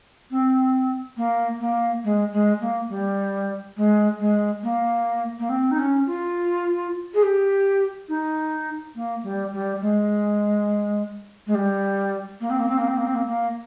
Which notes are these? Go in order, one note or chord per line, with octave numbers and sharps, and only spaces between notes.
C4
A#3
A#3
G#3
G#3
A#3
G3
G#3
G#3
A#3
A#3
C4
D#4
C#4
F4
G#4
G4
D#4
A#3
G3
G3
G#3
G#3
G3
A#3
C4
A#3
C4
A#3
C4
A#3
C4
A#3
A#3